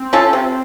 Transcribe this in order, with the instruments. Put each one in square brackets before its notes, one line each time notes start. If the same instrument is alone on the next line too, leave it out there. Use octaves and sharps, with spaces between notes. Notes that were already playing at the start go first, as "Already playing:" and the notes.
Already playing: [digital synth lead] C4
[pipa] C#4 F4 A4
C3